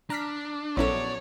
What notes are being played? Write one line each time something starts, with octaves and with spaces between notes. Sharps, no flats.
D4 A#5 F6 B6
A#1 F#3 B3 C#4 E4 A4 C#5 D5